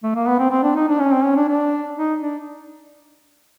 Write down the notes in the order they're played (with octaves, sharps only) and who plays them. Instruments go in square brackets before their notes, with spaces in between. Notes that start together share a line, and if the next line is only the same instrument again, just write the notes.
[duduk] A3
A#3
B3
C4
C4
D4
D#4
D4
C#4
C4
C#4
D4
D4
D#4
D4